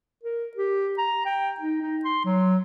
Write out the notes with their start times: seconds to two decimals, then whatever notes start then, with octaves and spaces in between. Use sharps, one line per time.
0.24 A#4
0.57 G4
0.98 A#5
1.26 G5
1.60 D#4
1.82 D#4
2.05 C6
2.25 F#3